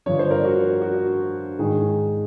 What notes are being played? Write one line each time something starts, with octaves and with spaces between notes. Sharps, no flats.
G2 D3 F3 C#5
C5
A#4
F#4
F#4
G#2 D#3 G#4